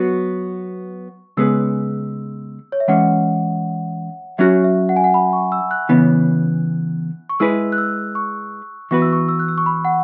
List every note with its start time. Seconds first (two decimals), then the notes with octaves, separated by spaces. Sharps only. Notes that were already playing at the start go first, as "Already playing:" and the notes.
Already playing: F#3 B3 F#4 C#6
1.37 C#3 G#3 B3 G#4 B4 E6
2.72 C#5
2.80 E5
2.88 E3 G#3 C#4 F#5
4.38 F#3 C#4 F#4 E5
4.64 E5
4.89 F#5
4.96 G#5
5.04 F#5
5.14 B5
5.33 C#6
5.52 E6
5.71 F#6
5.89 C#3 E3 B3
7.29 C#6
7.40 G#3 E4 G#4 B4 E6
7.72 F#6
7.78 E6
8.15 C#6
8.91 E3 B3 F#4 B4 C#6
9.02 E6
9.13 C#6
9.29 E6
9.39 F#6
9.48 E6
9.58 C#6
9.66 B5
9.85 F#5